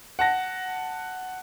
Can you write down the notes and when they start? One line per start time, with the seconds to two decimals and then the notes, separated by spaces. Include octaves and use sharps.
0.19 F#5 A5 A#6